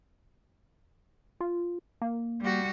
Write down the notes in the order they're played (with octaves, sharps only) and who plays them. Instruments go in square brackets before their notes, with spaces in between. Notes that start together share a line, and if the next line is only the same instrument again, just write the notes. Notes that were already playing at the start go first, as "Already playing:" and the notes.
[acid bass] F4
A#3
[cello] G3 F#4